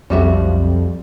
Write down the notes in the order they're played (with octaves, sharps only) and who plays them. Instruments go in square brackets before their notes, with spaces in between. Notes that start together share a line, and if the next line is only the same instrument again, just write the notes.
[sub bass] B1 [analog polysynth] F2 [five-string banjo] G3 F#4 E5